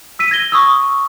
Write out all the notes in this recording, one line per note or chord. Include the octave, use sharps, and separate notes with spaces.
E6 B6 D#7
G#6 A#6 G7
C#6 D#6 E6